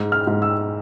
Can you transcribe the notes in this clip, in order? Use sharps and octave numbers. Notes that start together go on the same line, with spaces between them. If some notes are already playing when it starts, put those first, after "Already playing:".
Already playing: G#2
F6
G#2
E6